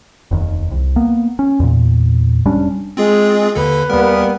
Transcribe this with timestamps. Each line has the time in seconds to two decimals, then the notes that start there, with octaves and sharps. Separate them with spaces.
0.31 F1 D#2
0.71 C2
0.96 A#3 B3
1.39 C#4
1.60 E2 A#2
2.45 F1 G3 C#4 D4
2.97 G#3 C4 F4 G#4
3.55 D#2 D3 A4 B4
3.90 D#2 G3 A#3 B3 A#4